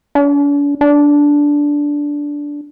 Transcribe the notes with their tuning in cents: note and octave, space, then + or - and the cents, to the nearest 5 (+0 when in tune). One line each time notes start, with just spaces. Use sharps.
D4 -45
D4 -10